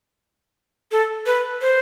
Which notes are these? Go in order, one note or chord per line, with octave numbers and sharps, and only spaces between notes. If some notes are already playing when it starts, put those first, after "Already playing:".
A4
B4
C5